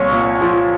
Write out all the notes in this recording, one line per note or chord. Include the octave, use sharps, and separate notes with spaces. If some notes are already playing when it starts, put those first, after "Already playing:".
Already playing: C2 A#2 F3 C#5 C#6
A#2
F3